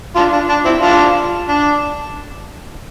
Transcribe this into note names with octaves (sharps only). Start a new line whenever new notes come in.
D4 F4
D4
D4
C4 E4
D4 F4
D4